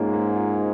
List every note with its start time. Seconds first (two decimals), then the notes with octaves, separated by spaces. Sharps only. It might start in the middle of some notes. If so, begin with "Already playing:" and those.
Already playing: G#2 A#3 C#4 F4
0.13 A#3
0.36 F4